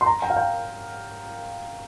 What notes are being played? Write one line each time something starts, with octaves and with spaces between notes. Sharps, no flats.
C6
A#5
G5
F5
G5